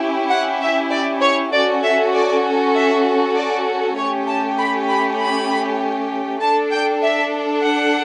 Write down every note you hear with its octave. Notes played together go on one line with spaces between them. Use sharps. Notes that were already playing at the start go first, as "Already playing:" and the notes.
Already playing: C#4 E4 G4
F#5
E5
D5
C#5
C#4 F#4 A4 D5
E5
D5
E5
D5
A3 C#4 G4 C#5
A5
B5
B5
B5
D4 A4 A5
G5
E5
F#5